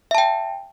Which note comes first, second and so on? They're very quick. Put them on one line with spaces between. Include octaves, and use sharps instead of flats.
E5 A5 G5